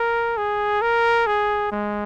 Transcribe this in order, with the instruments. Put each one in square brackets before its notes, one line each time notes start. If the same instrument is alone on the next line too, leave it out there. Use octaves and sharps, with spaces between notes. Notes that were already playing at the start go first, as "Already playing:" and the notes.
Already playing: [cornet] A#4
G#4
A#4
G#4
G#3